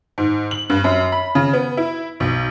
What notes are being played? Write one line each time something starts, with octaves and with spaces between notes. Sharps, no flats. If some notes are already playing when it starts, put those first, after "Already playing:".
G#2
F#7
G2
F#2
B5
C#3
B3
E4
B1